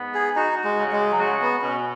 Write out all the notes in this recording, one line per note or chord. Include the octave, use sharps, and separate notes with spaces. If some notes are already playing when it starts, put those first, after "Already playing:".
Already playing: G#2 B3
G#4
D#4 F#4
G#3
C#3
G#3
F#3
G#3 F#4
B3
B2 C#4